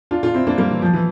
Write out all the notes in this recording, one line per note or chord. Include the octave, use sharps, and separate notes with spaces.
D4 F4
D4 F4
C4 E4
A#3 D4
G3 A#3
E3
F3
E3